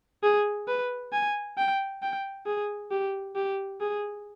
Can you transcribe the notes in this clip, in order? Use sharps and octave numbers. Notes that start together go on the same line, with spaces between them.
G#4
B4
G#5
G5
G5
G#4
G4
G4
G#4